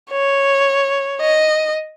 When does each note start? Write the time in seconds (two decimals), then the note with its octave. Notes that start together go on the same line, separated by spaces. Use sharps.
0.10 C#5
1.21 D#5